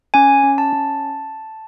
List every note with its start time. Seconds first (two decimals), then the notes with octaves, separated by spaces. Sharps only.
0.14 C#4 G#5
0.44 C#4
0.58 A5
0.73 C#4